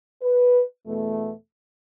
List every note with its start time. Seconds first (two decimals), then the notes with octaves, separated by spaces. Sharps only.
0.23 B4
0.86 E2 B2 A3